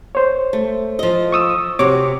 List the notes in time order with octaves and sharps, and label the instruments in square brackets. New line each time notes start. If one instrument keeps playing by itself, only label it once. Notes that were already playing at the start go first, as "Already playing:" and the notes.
[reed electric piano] C5 C#5
[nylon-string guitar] A3
F3 D#5
[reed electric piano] C#6 D#6 E6
[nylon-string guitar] C3 F#4 [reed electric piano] C#5 D6